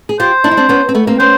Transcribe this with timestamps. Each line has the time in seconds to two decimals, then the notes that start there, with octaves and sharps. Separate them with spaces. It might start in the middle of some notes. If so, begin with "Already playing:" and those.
0.09 G#4
0.19 F4 G4 C5
0.44 D4 E4
0.51 D#4
0.57 C4 D4
0.69 B3 C#4
0.89 C4
0.95 A3 B3
1.07 A#3 C4
1.19 B3 C#4 C5